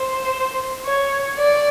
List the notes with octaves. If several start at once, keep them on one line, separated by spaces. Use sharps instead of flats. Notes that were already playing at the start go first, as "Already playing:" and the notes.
Already playing: C5
C#5
D5